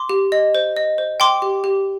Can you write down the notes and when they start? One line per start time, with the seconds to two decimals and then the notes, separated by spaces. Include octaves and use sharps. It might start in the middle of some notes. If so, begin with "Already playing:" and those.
Already playing: C6 D6
0.09 G4
0.32 D#5
0.55 C5
0.76 D#5
0.98 C5
1.20 G5 C6 D6
1.42 G4
1.64 G4